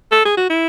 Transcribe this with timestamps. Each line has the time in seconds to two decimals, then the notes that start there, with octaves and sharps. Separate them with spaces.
0.12 A4
0.25 G#4
0.37 F#4
0.50 E4